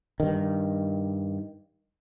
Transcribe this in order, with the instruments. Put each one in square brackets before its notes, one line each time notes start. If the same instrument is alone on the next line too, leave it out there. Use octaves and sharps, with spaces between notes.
[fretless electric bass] G2 D#3